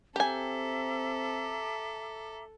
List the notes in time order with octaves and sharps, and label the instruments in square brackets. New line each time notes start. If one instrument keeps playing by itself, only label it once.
[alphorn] C4 [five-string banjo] G4 G#5 [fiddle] A4 [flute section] E5 A#5 D6